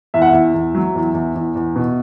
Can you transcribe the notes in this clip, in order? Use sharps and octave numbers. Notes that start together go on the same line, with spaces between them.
E2 E5
F#5
E2 E5
E2
F#3
E2
E2
E2
E2
B2